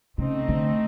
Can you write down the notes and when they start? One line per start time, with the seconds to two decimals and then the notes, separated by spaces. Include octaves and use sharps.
0.18 C#3 A3 C4 D#4
0.49 D3